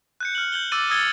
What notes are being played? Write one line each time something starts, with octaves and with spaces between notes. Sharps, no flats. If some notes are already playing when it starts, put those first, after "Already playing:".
F#6 G6 C#7
F6 F#7
G6 F#7 G7
D6 E6 A6 D#7 F#7
D#6 E6 G#6 A6 C#7 G7